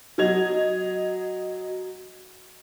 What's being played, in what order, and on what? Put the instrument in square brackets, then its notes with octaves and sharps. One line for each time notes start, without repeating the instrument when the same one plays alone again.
[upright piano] F#3 D#5 G#6 F7